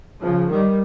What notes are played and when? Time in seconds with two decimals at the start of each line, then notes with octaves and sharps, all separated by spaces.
0.21 C#3 F3
0.49 D#3 G3